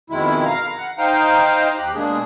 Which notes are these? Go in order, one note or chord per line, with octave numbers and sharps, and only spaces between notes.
F2 B2 D#3 G#3 E4
F5 A#5
F#5
D#4 C5 D#5 F5 G5 A#5
D#2 G4 F#6
B2 G#3 A#3 D4 G#4